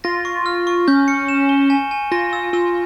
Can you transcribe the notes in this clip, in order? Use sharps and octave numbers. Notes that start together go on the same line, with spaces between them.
F4 A#6
C#6
F6
C#6
C#4 G6
C#7
E7
G7
G#5
G#5
F4 A#6
E6
F4 E6